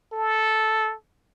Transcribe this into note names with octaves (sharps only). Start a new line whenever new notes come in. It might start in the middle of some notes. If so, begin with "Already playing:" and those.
A4